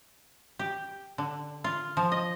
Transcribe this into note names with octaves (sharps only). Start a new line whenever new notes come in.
G4
D3
F4
F3
D#5